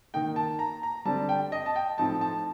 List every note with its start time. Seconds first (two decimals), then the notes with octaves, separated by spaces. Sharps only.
0.14 D#3 A#3 D#4 G5
0.36 A5
0.59 A#5
0.83 A#5
1.05 D3 G3 C4 A5
1.29 G5
1.52 D#5
1.66 A5
1.76 G5
1.98 A2 F3 C4 D#4 A5
2.21 A5